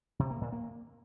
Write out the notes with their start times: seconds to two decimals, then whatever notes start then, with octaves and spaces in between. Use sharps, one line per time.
0.19 C3
0.30 A#3
0.41 A#2
0.52 A#3